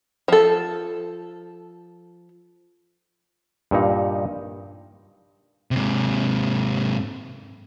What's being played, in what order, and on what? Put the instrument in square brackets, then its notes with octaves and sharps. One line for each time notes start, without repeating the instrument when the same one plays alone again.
[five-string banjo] F3 A4
[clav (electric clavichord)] G2 A#2 D#4
[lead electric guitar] G#2 C3